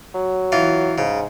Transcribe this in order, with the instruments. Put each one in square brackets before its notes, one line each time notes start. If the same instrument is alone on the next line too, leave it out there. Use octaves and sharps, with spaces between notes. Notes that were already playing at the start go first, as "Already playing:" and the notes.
[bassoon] F#3
[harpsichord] E3 F4
[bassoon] G#2 [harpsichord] C#3